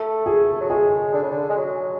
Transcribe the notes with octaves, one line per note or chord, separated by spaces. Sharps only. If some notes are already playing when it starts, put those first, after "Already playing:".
Already playing: A3 A4
G#4
F#3
G#3 G#4
D3
C#3
D3
G#3
F#3